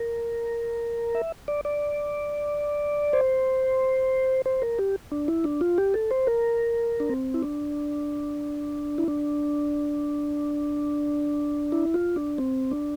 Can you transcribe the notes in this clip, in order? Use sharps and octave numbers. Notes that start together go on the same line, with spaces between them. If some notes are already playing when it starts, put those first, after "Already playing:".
Already playing: A#4
E5
D5
D5
C5
C5
A#4
G4
D4
E4
D4
F4
G4
A4
C5
A#4
D4
C4
E4
D4
E4
D4
E4
F4
D4
C4
D4